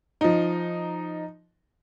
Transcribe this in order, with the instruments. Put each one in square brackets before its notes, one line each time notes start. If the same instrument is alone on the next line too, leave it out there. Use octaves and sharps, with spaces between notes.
[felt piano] F3 D#4